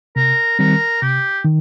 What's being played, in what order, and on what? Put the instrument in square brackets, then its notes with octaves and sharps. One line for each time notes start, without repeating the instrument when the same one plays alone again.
[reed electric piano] C3 [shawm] A#4
[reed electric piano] D#3 G3 C4 [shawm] A#4
[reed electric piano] C3 [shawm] G4
[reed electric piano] D#3